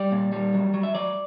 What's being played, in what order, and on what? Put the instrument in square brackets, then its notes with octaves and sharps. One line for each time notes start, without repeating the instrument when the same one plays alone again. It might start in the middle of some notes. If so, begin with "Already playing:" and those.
Already playing: [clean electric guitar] G3 D5
A#2
G3
F#3
F#3
E5
F#3 D5